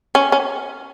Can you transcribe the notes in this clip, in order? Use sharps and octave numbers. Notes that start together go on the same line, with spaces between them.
C#4
C#4